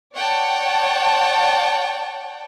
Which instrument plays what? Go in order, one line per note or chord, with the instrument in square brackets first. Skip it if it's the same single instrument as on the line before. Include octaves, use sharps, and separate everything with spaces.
[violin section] C#5 D5 F#5 G5 A5